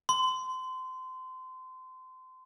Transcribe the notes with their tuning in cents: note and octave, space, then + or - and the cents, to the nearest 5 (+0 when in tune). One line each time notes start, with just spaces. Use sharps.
C6 -25